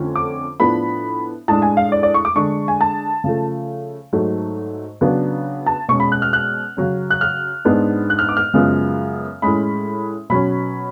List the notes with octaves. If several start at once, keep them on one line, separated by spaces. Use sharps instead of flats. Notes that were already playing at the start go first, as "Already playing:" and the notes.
Already playing: F2 D3 F3 A3 C#4
D6
A2 F3 B3 D4 B5
A2 G#3 D4 A5
G#5
F5
D5
D5
C#6
D6
D3 G#3 D4 C#6
G#5
A5
C#3 F3 A3
G#2 F#3 A3
C#3 F#3 B3 D4
A5
B2 G#3 C#4 C#6
B5
F#6
F6
F#6
C#3 F#3 C#4
F#6
F6
G#2 G#3 B3 D4
F#6
F6
D6
F6
F#2 C#3 F3 G#3 B3
A2 G#3 C#4 B5
B2 F#3 C#4 B5